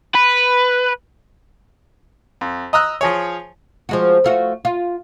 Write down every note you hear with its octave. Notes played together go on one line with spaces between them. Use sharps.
B4
F2
D#5 A#5 D#6 E6 F#6
F3 G#4 C#5
F3 G#3 F#4
A3 F4 F#4
F4